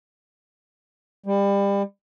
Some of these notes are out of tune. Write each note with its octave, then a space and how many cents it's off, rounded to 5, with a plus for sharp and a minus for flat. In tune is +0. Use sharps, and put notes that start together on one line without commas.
G3 +30